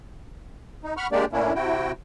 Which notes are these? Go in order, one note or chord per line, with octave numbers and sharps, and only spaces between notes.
D#4
F#5 B5 C#6 F6
G#3 A#3 D4 G4 D5
A2 A#3 C#4 D4 E4
C3 E4 F#4 G5